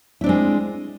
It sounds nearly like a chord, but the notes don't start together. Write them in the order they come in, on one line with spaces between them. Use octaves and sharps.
E4 D4 C4 G#3